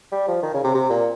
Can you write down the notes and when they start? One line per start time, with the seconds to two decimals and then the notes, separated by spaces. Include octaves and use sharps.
0.12 G3
0.28 F3
0.43 D#3
0.54 C#3
0.64 C3
0.74 C3
0.90 A#2